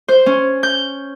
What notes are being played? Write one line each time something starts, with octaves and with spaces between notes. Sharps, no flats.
C5
C#4
G6